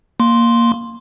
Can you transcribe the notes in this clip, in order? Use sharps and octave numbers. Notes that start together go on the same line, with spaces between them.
A#3 C6